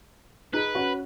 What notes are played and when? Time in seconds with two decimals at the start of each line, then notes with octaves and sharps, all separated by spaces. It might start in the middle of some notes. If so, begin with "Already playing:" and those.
0.53 D#4 G#4 B4
0.75 C#4 F#4